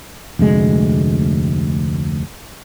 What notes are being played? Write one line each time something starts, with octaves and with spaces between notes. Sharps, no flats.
F1 D2 G#3